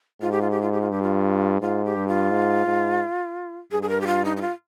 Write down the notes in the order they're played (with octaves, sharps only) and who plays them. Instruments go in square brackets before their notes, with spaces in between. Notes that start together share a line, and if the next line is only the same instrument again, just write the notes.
[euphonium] G#2 [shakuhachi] F4
[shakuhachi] G4
F4
G4
F4
G4
F4
[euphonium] G2 [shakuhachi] G4
[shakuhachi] F4
[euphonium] G#2 [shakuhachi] F4
[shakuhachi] G4
[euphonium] G2
[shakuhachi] F4
[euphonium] G#2
G#2
[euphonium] G2 [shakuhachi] G#4
[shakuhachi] G#4
A#4
G4
F4
D#4
D#4
F4